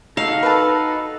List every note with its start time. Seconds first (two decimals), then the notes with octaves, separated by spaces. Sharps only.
0.17 D#4 F#4 A4 F5
0.43 A4 B4 A5